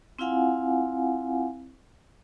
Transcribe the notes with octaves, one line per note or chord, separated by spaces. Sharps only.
C4 E4 F4 F5 F#5 G#5